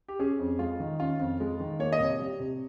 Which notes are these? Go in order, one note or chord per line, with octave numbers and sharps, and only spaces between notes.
G4
C#4 G#4
F2
G#3 F4
D#3
C#4 F4
F2
G#3
D#3
A#3 C#5
D#5
C2
C#5
G3
C3